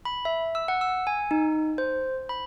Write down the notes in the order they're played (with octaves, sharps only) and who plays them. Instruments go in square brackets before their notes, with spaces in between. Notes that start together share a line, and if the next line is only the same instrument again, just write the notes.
[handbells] B5
E5
E6
F#5
E6
G#5
D#4
C5
B5